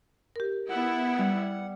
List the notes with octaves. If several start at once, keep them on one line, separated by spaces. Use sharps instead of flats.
G4 A#4
B3 E4 F#5
G3